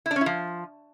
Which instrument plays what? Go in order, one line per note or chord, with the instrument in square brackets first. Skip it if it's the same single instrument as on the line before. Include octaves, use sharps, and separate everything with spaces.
[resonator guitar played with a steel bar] E4
D4
C#4
E4
F3